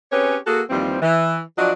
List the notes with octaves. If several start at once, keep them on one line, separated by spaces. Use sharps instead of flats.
C4 C#4 G4 G#4 B4 C#5
A#3 F#4 G#4 A4
D#2 E3 F3 G3 C4
E3
F3 F#3 D4 F#4 D5 D#5